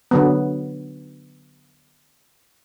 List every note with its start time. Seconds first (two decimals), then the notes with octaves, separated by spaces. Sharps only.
0.11 D3 F#3 B3